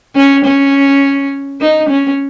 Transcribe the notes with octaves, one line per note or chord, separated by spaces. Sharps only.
C#4
C#4
D#4
C#4